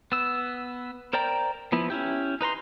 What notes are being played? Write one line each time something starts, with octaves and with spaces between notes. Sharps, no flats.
B3 E6
A#4 C5 D5 G5 A#5
F3 B3 E4
C#4 E4 G4
D#4 B4 A#5 C6